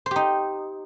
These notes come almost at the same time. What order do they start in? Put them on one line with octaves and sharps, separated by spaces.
C5 G4 D#4